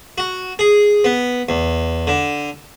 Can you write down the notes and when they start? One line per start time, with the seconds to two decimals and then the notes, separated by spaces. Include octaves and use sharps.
0.18 F#4
0.59 G#4
1.04 B3
1.49 E2
2.07 D3